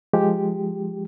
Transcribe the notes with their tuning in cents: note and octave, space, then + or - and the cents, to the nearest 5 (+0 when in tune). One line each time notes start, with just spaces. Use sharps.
F3 +0 G#3 +0 G4 +0